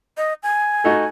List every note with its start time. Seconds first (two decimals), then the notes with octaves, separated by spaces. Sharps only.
0.17 D#5
0.43 G#5
0.84 A3 D#4 F#4